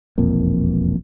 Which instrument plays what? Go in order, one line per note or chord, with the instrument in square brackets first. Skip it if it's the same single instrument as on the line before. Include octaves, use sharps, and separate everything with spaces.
[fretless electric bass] E1 A#1 F2 A#3